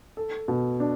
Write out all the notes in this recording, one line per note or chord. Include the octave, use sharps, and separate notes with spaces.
A4
B2
D4